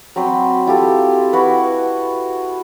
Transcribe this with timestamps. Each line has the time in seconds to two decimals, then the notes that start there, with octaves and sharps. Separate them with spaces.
0.16 F#3 C4 B5 C6
0.66 E4 F4 G4 A4
1.33 E4 F#4 B4